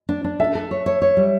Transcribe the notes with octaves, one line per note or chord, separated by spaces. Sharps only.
D4
D4
A4 E5
A4
C#5
C#5
C#5
G3